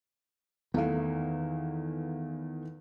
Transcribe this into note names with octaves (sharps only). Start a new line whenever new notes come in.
E2 D#3 E3 A3 F5